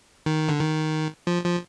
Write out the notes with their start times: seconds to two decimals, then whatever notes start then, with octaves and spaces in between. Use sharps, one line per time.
0.26 D#3
0.49 D3
0.60 D#3
1.27 F3
1.45 F3